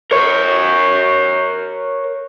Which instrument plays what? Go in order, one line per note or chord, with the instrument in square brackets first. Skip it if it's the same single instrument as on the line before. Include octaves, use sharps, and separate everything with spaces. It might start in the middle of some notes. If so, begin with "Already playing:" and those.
[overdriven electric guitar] A#4 C#5